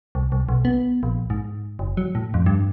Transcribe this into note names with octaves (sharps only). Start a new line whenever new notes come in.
C2
C2
B1
B3
A#1
G#2
F#1
F#3
A2
F2
G2